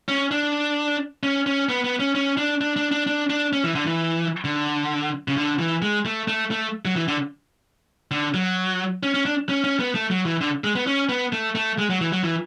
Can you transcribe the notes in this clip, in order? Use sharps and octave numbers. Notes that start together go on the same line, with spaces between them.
C#4
D4
C#4
C#4
B3
B3
C#4
C#4
D4
D4
D4
D4
D4
D4
C#4
E3
D3
E3
D3
C#3
D3
E3
G#3
A3
A3
A3
F#3
E3
D3
D3
F#3
C#4
C#4
D4
C#4
C#4
B3
A3
F#3
E3
D3
G#3
B3
C#4
B3
A3
A3
G#3
F#3
E3
F#3
E3